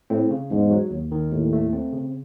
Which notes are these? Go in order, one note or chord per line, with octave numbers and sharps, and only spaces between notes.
A2 C4
C#3
E2 G#2
F#3
D#2
D#3
D#2 A2
A3
C4
C#3